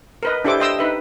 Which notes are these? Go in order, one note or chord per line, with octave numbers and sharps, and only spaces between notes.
A#4 B4 D#5
D4 E4 G4 A4 C5 D6
D#5 G5 C6 D#6 E6
D#4 B4 E5